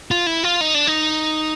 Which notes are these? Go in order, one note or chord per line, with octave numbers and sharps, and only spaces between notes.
F4
E4
F4
D#4
D4
D#4